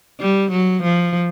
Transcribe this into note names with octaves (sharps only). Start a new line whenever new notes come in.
G3
F#3
F3